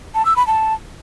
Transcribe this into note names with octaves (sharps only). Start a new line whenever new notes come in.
A5
E6
B5
A5